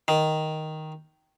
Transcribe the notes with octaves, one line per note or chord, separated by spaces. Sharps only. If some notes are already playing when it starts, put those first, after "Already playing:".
D#3